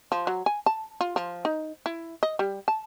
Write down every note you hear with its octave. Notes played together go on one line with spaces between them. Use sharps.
F3
F#3
G#5
A5
F4
F3
D#4
E4
D#5
G3
A5